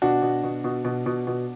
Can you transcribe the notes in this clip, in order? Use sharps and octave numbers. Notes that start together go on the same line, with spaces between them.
B2 D4 F#4
B2
B2
B2
B2
B2
B2